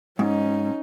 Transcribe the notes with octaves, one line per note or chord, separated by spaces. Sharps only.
G#2 C#4 D#4